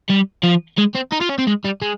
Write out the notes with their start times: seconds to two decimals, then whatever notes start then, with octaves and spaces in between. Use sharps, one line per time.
0.09 G3
0.43 F3
0.78 G#3
0.95 C4
1.12 D#4
1.21 F4
1.29 C#4
1.38 C4
1.47 G#3
1.64 G3
1.82 G#3